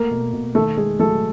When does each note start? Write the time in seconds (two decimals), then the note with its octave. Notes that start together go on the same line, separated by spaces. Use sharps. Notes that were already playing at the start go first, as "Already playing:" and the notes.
Already playing: A3 A#3 A#4
0.11 B2
0.33 B2
0.55 D#3 A3 A4
0.77 G#3 A3 G#4
0.99 F#3 A3 A4